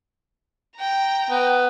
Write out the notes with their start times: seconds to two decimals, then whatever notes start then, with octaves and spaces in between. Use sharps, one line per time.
0.77 G5 A#5
1.30 B3